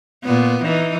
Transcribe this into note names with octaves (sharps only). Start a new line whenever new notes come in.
A#2 B3
E3 D#4